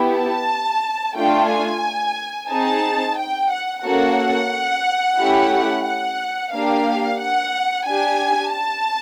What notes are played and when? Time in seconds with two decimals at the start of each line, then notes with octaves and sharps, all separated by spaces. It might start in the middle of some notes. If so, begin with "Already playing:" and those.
Already playing: B3 E4 G4
0.15 A5
1.16 A3 D4 F4 G5
1.50 G#5
2.51 C4 D#4 G#4 A5
3.18 G5
3.51 F#5
3.84 A#3 C#4 F#4 A4 F#5
5.18 A3 C#4 E4 G4
5.86 F#5
6.53 A#3 D4 G4 F5
7.20 F#5
7.87 D4 G4 G#5
8.54 A5